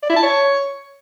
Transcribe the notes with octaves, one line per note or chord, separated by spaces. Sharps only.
D5
E4
A5
C#5